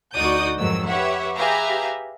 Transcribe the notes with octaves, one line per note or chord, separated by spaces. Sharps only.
D2 D#4 F#4 D5 D#6 G6
F2 G#2 D#3 F#3 E6
G4 B4 C#5 E5 F#5
G4 G#4 B4 E5 F5 A#5